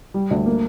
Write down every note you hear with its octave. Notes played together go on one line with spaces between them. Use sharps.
G3
D2
A#3